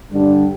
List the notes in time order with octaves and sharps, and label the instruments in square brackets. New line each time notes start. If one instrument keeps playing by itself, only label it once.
[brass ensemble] G2 D3 G3 D4